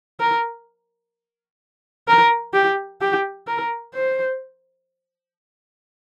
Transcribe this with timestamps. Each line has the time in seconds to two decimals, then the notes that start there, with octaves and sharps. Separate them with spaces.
0.20 A#4
2.08 A#4
2.54 G4
3.01 G4
3.47 A#4
3.94 C5